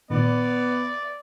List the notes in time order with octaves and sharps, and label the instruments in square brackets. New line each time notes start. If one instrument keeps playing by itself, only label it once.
[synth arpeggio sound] A#2 D#3 [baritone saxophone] B3 [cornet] D5